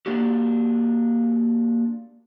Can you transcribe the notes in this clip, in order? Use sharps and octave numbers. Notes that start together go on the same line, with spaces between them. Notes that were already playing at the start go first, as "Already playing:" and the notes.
A#3 D4 F#4 G4